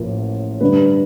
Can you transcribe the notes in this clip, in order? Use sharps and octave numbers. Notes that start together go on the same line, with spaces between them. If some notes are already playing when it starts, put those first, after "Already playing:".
Already playing: A1 A2 F3 A#3
G2 D3 G3 B4